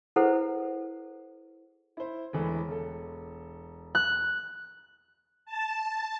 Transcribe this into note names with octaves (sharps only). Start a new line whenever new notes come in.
E4 G#4 A4 B4 C5 F#5
E4 C5
E1 E3 A3
E1 A4
F#6
A5